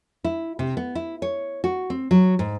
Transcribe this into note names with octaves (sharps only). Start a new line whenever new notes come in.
E4
C3
B3
E4
C#5
F#4
C4
F#3
G#2